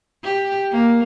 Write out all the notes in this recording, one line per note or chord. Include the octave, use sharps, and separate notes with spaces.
G4
A#3